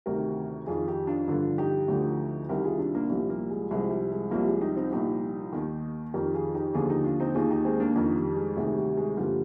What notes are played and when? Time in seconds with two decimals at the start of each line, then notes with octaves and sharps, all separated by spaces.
0.06 D2 C3 D#3 G4 A#4
0.66 F2 D#3 F4 G#4
0.87 D#4 G4
1.07 D4 F4
1.27 G2 D3 F3 D4 F4
1.58 D#4 G4
1.88 D2 D3 F3
2.49 C2 C3 D#3 G4 A#4
2.64 F4 G#4
2.79 D4 F4
2.95 A#3 D4
3.10 C2 A#2 F3 G3 A#3
3.30 G3 A#3
3.50 G#3
3.71 C2 C3 F3 G#3
3.91 G3
4.11 G#3
4.31 C2 C3 F3 G3 A#3
4.47 G#3
4.61 D#4 G4
4.77 C4 D#4
4.92 C2 A#2 F3 D#4 G4
5.52 D#2 D#3
6.14 F2 D#3 G4 A#4
6.34 F4 G#4
6.54 D#4 G4
6.74 D#2 D3 F3 F4 G#4
6.89 D#4 G4
7.04 D4 F4
7.20 C4 D#4
7.35 D#2 D#3 F4 G#4
7.50 D#4 G4
7.65 G#3 C4
7.80 A#3 D4
7.96 F2 D#3 A#3 D4
8.16 G3
8.37 G#3
8.57 D2 C3 D#3 G#3
8.77 G3
8.97 G#3
9.17 G2 D3 F3 G3 A#3